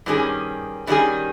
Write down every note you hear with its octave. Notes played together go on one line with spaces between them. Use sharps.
G2 D#3 G3 C#4 G#4
G2 D#3 G3 C#4 G#4